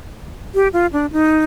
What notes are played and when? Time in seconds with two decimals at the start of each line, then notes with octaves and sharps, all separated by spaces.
0.54 G4
0.73 F4
0.93 D4
1.12 D#4